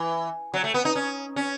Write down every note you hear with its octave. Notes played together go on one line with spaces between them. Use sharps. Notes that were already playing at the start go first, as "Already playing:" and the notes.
Already playing: E3
F#3
A3
B3
D#4
C#4
C#4